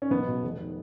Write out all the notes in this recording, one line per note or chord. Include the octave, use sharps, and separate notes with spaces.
C#4
B1 B3
B2
F1
D#3